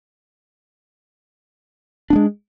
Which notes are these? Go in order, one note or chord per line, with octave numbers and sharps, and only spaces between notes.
G#3 B3 D4